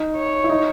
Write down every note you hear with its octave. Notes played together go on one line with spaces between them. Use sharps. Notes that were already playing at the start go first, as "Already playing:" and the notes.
Already playing: D#4
C#5
E4
D#4